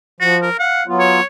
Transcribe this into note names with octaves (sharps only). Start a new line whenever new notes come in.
F3 F#4
A#4
F5 F#5
F#3 B3 F4
C#5